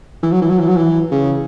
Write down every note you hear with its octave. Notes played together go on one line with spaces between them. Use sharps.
E3
F#3
E3
F#3
E3
F#3
E3
C#3